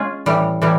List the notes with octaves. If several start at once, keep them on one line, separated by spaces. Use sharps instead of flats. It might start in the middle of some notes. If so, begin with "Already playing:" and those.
Already playing: G#3 C#4 F4 G#4
A2 E3 G3
A2 E3 G3